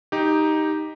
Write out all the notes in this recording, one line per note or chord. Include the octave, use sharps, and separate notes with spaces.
D#4 G4